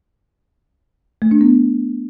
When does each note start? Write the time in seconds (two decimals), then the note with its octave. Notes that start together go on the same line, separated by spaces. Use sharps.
1.22 A3
1.31 D4
1.41 B3